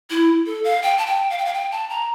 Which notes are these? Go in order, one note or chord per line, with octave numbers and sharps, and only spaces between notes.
E4
A4
F5
G5
A5
G5
F5
G5
F5
G5
A5
A#5